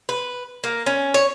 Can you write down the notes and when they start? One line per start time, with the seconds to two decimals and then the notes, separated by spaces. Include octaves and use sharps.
0.09 B4
0.64 A#3
0.86 C#4
1.14 C#5